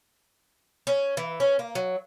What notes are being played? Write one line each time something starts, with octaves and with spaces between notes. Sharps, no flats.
C#4
E3
C#4
A#3
F#3